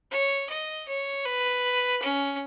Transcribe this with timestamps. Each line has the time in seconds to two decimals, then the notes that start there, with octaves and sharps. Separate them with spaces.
0.11 C#5
0.49 D#5
0.88 C#5
1.26 B4
2.02 C#4